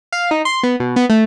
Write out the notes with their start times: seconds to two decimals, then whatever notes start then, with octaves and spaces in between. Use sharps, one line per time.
0.12 F5
0.31 D#4
0.45 C6
0.63 B3
0.80 B2
0.96 B3
1.10 A3